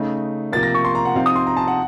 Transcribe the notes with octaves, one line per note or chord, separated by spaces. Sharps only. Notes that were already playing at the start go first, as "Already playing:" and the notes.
Already playing: C#3 A3 D#4
C3 F3 A#3 A6
A#6
C#6
C6
A#5
F#5
C3 F3 C4 D#4 F5
D#6
C6
A#5
A5
F#5